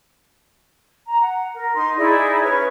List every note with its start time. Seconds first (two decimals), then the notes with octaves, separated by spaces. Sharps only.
1.07 A#5
1.22 F#5
1.54 A#4
1.75 D#4 C6
1.97 D#4 E4 G#4 D5
2.42 C#4 B4 C#5 C#6